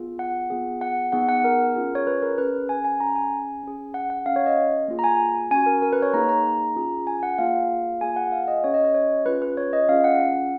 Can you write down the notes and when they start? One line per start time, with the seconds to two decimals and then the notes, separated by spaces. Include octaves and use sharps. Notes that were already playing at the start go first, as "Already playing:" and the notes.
Already playing: B3 F4 G#4
0.19 F#5
0.50 B3 F4 G#4
0.81 F#5
1.12 B3 D#4 G#4 F#5
1.29 F#5
1.44 A#4
1.75 C#4 F4 G#4
1.95 C#5
2.07 B4
2.22 A#4
2.38 C#4 G#4 B4
2.69 G#5
2.85 G#5
3.00 C#4 G#4 A#5
3.16 G#5
3.63 C#4 G#4
3.94 F#5
4.10 F#5
4.26 C#4 G#4 F5
4.36 C#5
4.46 D#5
4.88 A#3 F4 G#4
4.99 A#5
5.04 G#5
5.51 C#4 F#4 G#5
5.66 A#4
5.82 A#4
5.93 B4
6.02 C#5
6.13 A#3 D#4 G#4 A#5
6.29 A#5
6.76 C#4 F4 G#4
7.07 G#5
7.23 F#5
7.38 A#3 F4 G#4 F5
8.01 A#3 F4 G#4 G#5
8.16 F#5
8.32 F5
8.48 D#5
8.63 C#4 G#4 C#5
8.74 D#5
8.84 D#5
8.94 C#5
9.26 C#4 F4 G#4 B4
9.42 B4
9.57 C#5
9.73 D#5
9.89 C#4 F4 G#4 F5
10.04 F#5